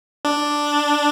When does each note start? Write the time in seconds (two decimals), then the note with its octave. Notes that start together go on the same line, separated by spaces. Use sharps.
0.25 D4